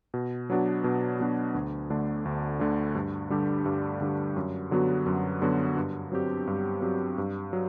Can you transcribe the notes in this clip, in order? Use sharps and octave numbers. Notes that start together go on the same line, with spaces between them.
B2
F#3 B3 D4 F#4
B2
F#3 B3 D4 F#4
D2
D3 A3 D4
D2
D3 A3 D4
G2
D3 G3 D4 G4
G2
D3 G3 D4 G4
F#2
D3 F#3 B3 F#4
F#2
D3 F#3 B3 F#4
G2
F#3 C4 G4
G2
F#3 C4 G4
G2
F#3